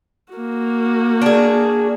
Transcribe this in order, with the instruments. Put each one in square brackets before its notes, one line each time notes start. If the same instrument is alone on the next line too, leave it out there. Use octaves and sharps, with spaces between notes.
[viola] A#3 F#4
[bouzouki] D4 G#4